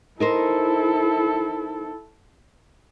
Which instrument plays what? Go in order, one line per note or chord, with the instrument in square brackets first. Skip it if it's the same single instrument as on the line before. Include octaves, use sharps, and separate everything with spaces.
[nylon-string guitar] D#4 A#4 C5 [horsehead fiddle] E4 A4